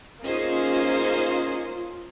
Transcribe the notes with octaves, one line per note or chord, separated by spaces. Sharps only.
A#3 C#4 D#4 F4 G#4 C5 D#5